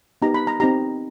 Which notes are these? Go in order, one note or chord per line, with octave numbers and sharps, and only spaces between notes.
B3 D#4 G4 A#5
B5
A#5
C4 D#4 G4 A#5